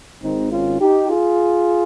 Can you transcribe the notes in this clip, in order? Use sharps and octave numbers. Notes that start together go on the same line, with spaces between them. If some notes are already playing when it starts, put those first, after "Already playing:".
G#1 G#2 D#3 C4 D#4
C#4 F4
D#4 G4
F4 G#4